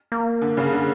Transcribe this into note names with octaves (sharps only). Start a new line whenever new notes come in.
A#3
D3
C#3
D3